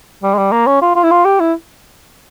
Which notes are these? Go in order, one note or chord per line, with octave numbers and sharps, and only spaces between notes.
G3
G#3
G3
A#3
C#4
F4
F4
E4
F4
G4
E4